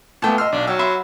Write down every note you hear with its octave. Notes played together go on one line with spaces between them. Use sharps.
A#2 A3 B3 G5 A5
D#5 C6 E6 F6
B1 D4
F#3 G5 E6
E5 B5 C6